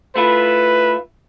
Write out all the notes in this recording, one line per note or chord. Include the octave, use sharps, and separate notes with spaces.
A3 E4 F4 B4